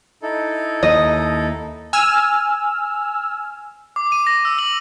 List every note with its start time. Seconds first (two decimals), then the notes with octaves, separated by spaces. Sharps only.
0.22 D#4 E4 A4
0.83 D#2 D#5
1.93 G#5 E6 F6
3.96 D6
4.12 D#7
4.27 A#6
4.45 E6
4.59 F#7